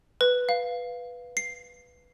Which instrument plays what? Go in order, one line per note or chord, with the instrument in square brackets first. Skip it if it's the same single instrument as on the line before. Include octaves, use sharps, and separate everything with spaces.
[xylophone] B4
F5
C7